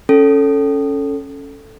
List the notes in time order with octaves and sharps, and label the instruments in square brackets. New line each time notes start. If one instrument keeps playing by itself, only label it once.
[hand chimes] C#4 A4